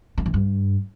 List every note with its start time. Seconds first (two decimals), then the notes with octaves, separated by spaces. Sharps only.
0.18 D3
0.26 E3
0.34 G2